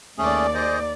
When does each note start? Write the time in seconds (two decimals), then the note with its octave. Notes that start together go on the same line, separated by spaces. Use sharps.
0.18 D#2 A3 C#4 G#4 D5
0.54 G#4 C5 D#5